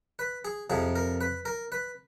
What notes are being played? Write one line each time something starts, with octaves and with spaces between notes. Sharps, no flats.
B4
G#4
F2 C3 F3 G#4
A#4
B4
A#4
B4